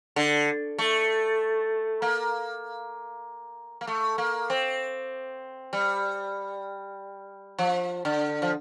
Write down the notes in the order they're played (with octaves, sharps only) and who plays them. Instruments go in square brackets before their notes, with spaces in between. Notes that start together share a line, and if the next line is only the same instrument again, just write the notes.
[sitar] D3
A3
A#3
A#3
A3
A#3
C4
G3
F3
D3
F3